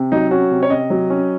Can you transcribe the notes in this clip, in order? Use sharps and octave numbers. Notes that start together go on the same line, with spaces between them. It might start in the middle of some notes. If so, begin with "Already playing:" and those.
Already playing: C3
F#3 D#4
C#4 F#4
C3
C#5
C3 D#5
F#3
C#4